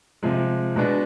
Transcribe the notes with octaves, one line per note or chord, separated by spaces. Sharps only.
C3 F3 G#3
B2 G#3 B3 D4